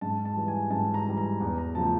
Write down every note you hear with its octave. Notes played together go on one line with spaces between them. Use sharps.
G#2 A5
A5
E3 G3
G#5
G#2 A5
A#5
E3 G3
A#5
E2
A#5
C#3 F3 A3 A5